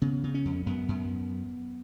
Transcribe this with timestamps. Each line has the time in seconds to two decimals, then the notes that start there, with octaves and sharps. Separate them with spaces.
0.02 C#3 B3
0.24 C#3
0.34 C#4
0.45 F2
0.66 F#2 B3
0.88 F#2